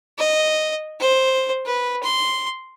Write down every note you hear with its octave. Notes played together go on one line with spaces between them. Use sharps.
D#5
C5
B4
C6